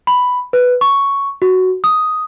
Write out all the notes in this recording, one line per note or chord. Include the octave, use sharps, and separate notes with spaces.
B5
B4
C#6
F#4
D#6